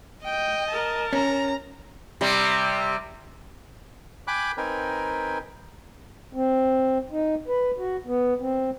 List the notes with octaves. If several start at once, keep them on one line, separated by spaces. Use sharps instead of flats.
D#5 G5
A#4 A5
C#4 A#5
C3 G3
G5 G#5 B5 D6 F#6
C4 D#4 A#4 B4 G5 G#5
C4
D#4
B4
F#4
B3
C4